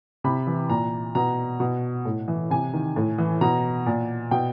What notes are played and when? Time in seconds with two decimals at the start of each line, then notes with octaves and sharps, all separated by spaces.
0.24 C3 B5
0.47 E3
0.69 A#2 A#5
1.15 B2 A#5
1.60 B2
2.05 A2
2.28 E3
2.50 C3 G#5
2.73 D#3
2.96 A2
3.18 E3
3.41 B2 A#5
3.86 A#2
4.31 B2 G5